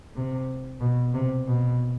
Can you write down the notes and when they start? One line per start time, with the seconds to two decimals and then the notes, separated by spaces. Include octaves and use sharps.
0.16 C3
0.81 B2
1.14 C3
1.47 B2